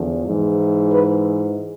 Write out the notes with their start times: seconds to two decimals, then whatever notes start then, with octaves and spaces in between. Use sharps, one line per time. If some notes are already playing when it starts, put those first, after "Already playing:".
Already playing: E2 D3 F3
0.26 G#2 E3
0.91 B4